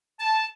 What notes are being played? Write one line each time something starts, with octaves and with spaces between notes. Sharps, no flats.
A5